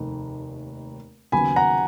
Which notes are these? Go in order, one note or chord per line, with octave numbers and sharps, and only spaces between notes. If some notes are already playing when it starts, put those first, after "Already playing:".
Already playing: F1 D#2 D#3
D#2 C#3 F#3 B3 G#5 B5
F#5 A#5